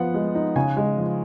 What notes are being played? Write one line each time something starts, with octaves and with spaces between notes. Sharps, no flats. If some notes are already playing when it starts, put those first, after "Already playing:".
Already playing: F3 B3 F#5
G#3
D#4
C#3 G#5
G#3
F3